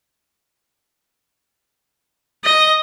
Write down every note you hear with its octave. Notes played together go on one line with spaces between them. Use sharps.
D#5